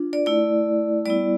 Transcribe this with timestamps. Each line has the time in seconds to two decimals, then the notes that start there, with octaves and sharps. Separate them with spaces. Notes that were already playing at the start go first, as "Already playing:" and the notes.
Already playing: D4 F4
0.13 D5
0.26 A3 E4 D5
1.05 G3 B3 E4 D5